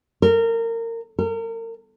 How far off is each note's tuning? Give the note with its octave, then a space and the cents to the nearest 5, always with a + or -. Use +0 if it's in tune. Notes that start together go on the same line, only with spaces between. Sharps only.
A#4 -25
A#4 -35